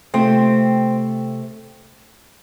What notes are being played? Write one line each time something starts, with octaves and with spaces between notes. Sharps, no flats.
C3 A3 C4 F4 C5